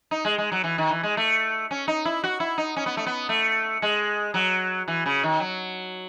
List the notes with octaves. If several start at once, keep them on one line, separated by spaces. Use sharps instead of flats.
D#4
G#3
G#3
F#3
E3
D#3
E3
G#3
A3
C#4
D#4
E4
F#4
E4
D#4
C#4
B3
A3
B3
A3
G#3
F#3
E3
C#3
D#3
F#3